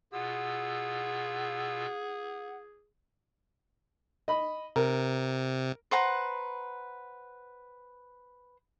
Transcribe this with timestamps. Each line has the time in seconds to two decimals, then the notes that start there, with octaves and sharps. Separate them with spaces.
0.13 B2 F4 G#4 F#5 E6
4.28 D#5 B5
4.76 C3 A#4
5.91 B4 C5 F#5 A#5